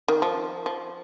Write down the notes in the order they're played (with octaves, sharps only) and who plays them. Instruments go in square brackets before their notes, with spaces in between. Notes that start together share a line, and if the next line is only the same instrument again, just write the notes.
[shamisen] D#3
F3
F3